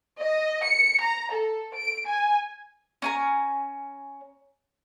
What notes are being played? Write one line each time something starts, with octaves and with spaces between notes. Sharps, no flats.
D#5
C#7
A#5
A4
D7
G#5
C#4 G#5 A#5